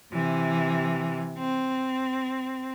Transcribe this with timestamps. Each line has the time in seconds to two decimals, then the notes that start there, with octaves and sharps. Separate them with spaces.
0.12 C3 E3
1.38 C4